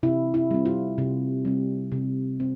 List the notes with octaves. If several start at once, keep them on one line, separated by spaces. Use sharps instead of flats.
C3 E4
E4
G3 C4
F4
C3
G3 C4
C3
C4